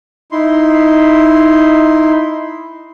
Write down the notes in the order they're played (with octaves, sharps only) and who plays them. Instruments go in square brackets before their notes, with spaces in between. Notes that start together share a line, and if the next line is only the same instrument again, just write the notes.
[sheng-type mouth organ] D#4 E4 C6